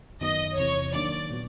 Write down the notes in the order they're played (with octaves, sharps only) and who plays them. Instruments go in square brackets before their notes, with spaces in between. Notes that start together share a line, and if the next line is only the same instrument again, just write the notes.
[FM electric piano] F#2 D#3 F#3 B3 [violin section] D#5
[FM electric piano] E2 C3 E3 [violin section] C#5
[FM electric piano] D#3 F#3 A#3 D4 [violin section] D5
[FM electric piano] A#2 F#3 B3